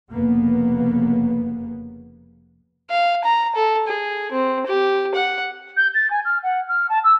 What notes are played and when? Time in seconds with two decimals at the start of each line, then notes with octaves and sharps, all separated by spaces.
0.11 F1 C#3 A#3 B3
2.90 F5
3.24 A#5
3.56 A4
3.88 G#4
4.32 C4
4.67 G4
5.15 F#5
5.76 G6
5.94 A6
6.10 G#5
6.24 F6
6.42 F#5
6.68 F6
6.89 A5
7.03 E6